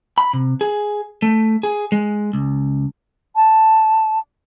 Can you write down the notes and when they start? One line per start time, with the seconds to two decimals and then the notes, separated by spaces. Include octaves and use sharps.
0.18 B5
0.33 C3
0.61 G#4
1.22 A3
1.63 G#4
1.92 G#3
2.33 C#2
3.36 A5